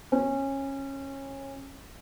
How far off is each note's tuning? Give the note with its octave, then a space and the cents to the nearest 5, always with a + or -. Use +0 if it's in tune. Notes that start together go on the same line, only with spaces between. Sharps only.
C#4 -20